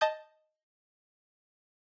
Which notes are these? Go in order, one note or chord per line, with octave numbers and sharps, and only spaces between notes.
D#5 A5 D#6 G6